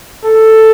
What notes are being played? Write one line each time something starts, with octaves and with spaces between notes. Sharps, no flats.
A4